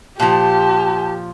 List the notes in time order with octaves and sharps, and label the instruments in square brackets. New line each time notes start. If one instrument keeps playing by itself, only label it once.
[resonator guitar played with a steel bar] A#2 F3 [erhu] G4 [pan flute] A5